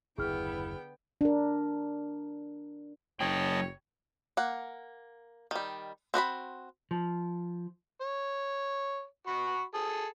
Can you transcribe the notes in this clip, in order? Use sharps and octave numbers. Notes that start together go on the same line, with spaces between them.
F#1 D#2 D3 B3 E4 G#4 G5 F6
D4 A#4
F#1 F#3 C#5 D#5 G5 A5
A#3 F#5
D#3 G3
C4 F#4 D#5 B5
F3
C#5
F#4 B5 C#6
G#4 A4